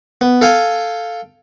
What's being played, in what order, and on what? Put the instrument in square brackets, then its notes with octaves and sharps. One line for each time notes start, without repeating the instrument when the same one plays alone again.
[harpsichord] B3
A4 F5 G5 G#5